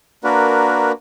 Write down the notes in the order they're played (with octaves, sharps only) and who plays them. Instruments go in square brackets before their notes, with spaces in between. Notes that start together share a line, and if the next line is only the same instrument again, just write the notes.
[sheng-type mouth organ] A#3 D4 F#4 A#4 B4